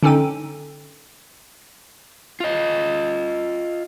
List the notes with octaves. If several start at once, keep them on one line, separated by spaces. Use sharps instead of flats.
D3 C#4 D#4 A4 G5 D#7
F4 D#5